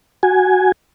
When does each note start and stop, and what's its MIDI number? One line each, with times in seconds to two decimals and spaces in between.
0.23 0.72 66
0.23 0.72 80